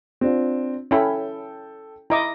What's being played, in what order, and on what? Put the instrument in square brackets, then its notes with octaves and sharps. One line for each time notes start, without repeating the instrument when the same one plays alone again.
[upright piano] C4 D4 F4
[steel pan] C#4 E4 B5 [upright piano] A4 G5
[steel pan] E4 D#5 D6 [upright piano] A#5